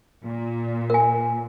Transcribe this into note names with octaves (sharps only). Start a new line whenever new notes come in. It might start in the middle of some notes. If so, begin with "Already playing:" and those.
A#2
A#4 G#5